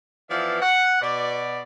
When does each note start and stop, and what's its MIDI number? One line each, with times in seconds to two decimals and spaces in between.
0.30 0.58 52
0.30 0.58 53
0.30 0.58 59
0.30 0.58 74
0.30 0.58 76
0.30 0.58 77
0.61 0.99 78
1.01 1.60 47
1.01 1.60 74